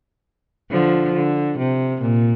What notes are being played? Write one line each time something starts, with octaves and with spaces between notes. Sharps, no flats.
D3 F3
D3
C3
A#2